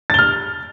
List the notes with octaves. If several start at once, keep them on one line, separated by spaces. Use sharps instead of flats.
F6 A6 G7